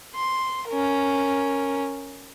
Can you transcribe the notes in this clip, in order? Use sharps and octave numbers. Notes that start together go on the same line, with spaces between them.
C6
C#4 A#4